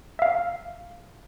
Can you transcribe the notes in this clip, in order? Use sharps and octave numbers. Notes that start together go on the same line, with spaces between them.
E5 F5